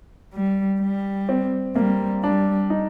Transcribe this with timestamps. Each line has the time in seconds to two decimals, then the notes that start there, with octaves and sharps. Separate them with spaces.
0.33 G3
0.81 G3
1.29 C4
1.76 G3 A#3
2.24 G3 D4
2.70 D#4